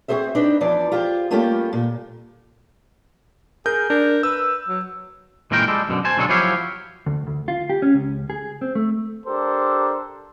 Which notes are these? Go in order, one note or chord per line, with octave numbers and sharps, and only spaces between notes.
C4 F#4 G#4 C5 E5
C4 D4 D#4 B4
E2 E3 F3 D5
F4 G4 G#4 C5
G3 A3 A#3 C#4 F4 G4
A#2
G#4 A#4 G6
D4 A#4
B4 E6
F#3
A#2 E3 G#3 A#4 G5
G3 G#3 A4
F#2 B2 D3
C5 G#5 A5
B1 D3 F#3 G#3 G#4 A4
F3 F#3 E4 G4 C#5 F5
D2
D2
F4
G4
C#4
C#2
G#4
C4
A3
D4 G4 A4 A#4 C5